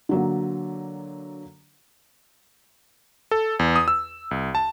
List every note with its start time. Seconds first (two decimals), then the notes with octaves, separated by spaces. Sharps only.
0.09 D3 F#3 A#3
3.31 A4
3.59 E2
3.76 D#6
3.88 E6
4.31 C2
4.55 A5